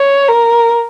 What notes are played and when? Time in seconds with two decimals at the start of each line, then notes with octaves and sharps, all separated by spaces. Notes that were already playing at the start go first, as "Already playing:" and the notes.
Already playing: C#5
0.28 A#4